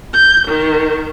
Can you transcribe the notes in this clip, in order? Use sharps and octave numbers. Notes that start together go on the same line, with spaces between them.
G6
D#3